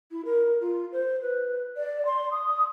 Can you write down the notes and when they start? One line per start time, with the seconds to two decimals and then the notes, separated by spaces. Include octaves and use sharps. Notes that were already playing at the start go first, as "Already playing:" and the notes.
0.11 E4
0.25 A#4
0.60 F4
0.92 C5
1.21 B4
1.76 D5
2.05 C6
2.31 D#6